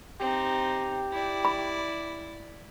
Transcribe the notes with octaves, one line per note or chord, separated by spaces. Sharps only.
C4 D#4 G4
E4 D5
B5